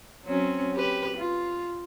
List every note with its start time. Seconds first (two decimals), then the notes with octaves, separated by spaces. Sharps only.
0.24 F#3 C4 C#4
0.74 G4 B4
1.17 F4